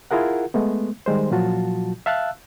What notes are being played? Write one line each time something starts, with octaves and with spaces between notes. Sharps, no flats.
E4 F4 G#4 A#4 F#5
G#3 A3 B3
D#3 G3 G#3 C5
A#2 F3 F#3 F4 F#4 A5
E5 F5 A5 E6 F#6